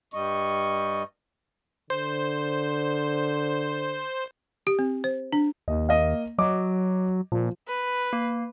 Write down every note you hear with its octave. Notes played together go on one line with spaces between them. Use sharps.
G2 G3 D#5 C#6
D3 C5
G4
C4
C5
D4
D#2 D#5
A#3 D#5 F5
F#3 D#5 D6
A#2 F3
B4
A#3